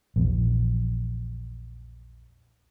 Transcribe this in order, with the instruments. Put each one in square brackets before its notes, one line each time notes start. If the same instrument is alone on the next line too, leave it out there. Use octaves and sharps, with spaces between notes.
[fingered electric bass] A#1 E2